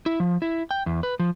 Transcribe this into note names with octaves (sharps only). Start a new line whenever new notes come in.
E4
F3
E4
G5
E2
B4
F3